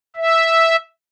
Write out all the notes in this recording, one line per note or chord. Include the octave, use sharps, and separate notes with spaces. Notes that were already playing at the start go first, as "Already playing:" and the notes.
E5